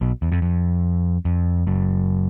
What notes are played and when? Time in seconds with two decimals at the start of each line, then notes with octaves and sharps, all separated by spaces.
0.01 B1 B2
0.22 E2
0.32 F2
0.42 F2
1.25 F2
1.67 F#1 F#2